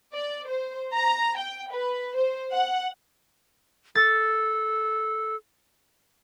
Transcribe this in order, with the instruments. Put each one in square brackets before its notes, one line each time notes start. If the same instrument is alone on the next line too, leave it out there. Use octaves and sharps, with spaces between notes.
[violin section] D5
C5
A#5
G5
B4
C5
F#5
[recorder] A4 [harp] A6